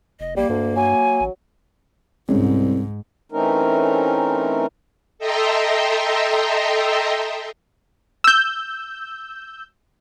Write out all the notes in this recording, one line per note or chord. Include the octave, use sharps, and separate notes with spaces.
F1 D#5
A#1 G3 A#3
D2 G2
F#3 G#5
A1
C2 G#2 G#3 C#4
E3 A3 C4 C#4 D#4 A#4
A4 D#5 E5 G5 A#5 C6
E6 G6